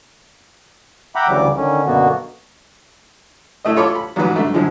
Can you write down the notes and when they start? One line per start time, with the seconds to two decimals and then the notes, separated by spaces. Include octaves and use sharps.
1.15 E5 F#5 G5 A#5 B5 D6
1.28 D2 C#3 E3 F#3 G3 D6
1.57 D3 D#3 C#4
1.86 F#2 B2 D3 A#3 B3 F#4
3.65 A2 A3 D#5
3.76 F4 A4 C#5 B5 C6 D6
3.95 B5
4.16 A1 G#2 F#3 B4
4.36 G2 A3
4.54 F#2 A2 D3 F3 G#3